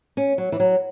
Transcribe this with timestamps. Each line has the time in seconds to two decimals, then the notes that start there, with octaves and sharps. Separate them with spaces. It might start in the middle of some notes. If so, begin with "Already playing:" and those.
0.17 C#4
0.38 F#3
0.52 E3
0.60 F#3